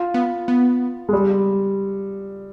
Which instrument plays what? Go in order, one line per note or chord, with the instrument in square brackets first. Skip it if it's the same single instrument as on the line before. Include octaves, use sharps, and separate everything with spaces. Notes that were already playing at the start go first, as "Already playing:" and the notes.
Already playing: [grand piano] F4
[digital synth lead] B3
B3
[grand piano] G#3
G3